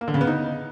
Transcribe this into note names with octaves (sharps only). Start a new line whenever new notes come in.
A#3
D3
C#3
B3
D#4